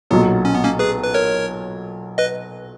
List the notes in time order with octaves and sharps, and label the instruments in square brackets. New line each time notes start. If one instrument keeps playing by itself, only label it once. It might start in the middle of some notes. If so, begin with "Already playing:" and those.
[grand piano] B1 A#2 F#3 [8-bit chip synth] B3
[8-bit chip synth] C#4
B3
A#3 C#4
G#4 B4
B4
A#4 C#5
B4 D#5